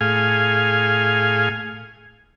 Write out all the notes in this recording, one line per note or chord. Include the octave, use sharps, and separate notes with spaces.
A2 G#4 F5 G#5